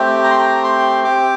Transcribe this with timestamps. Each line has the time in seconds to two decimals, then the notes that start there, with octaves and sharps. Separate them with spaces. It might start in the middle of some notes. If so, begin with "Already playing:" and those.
Already playing: A3 C4 G4
0.24 A#5
0.31 C6
0.38 A#5
0.64 C6
1.04 C4 G4 D6